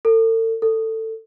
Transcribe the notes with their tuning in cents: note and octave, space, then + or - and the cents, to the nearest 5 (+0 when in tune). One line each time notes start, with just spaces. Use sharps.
A4 +40
A4 +20